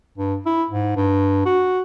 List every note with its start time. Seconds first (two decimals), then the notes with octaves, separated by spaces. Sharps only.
0.18 G2
0.46 E4
0.71 G#2
0.96 G2
1.45 F#4